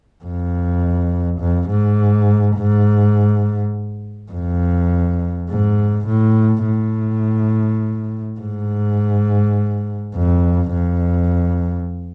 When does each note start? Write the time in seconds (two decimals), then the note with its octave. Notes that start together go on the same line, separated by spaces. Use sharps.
0.24 F2
1.40 F2
1.70 G#2
2.57 G#2
4.31 F2
5.49 G#2
6.07 A2
6.66 A2
8.40 G#2
10.15 F2
10.73 F2